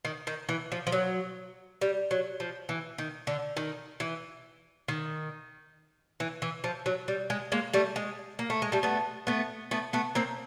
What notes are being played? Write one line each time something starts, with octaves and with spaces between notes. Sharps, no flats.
D#3
D#3
E3
F3
F3
F#3
G3
F#3
F3
E3
D#3
D3
D#3
E3
D#3
E3
E3
F3
F#3
G3
G#3
G#3 A#3
G3 A3
G#3
A#3
A3
G#3
G3 A3
A3 B3
A3 B3
A3 B3
A3 B3
A#3 C4